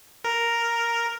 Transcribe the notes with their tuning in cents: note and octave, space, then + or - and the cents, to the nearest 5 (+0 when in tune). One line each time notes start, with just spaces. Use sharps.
A#4 +0